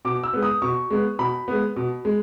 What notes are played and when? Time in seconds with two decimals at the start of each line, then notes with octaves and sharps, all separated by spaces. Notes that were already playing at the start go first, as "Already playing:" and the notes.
0.05 B2 D6
0.24 E6
0.33 G#3 B3
0.42 D#6
0.62 B2 C#6
0.91 G#3 B3
1.19 B2 B5
1.48 G#3 B3
1.76 B2
2.05 G#3